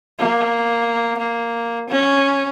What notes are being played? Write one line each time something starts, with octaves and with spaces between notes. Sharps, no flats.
A#3
A#3
C#4